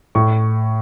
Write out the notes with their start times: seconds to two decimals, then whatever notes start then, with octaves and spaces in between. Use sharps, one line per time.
0.15 A2 C#6